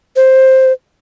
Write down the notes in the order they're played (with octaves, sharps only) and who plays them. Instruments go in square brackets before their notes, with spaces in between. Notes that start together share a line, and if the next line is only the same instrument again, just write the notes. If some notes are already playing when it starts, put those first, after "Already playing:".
[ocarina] C5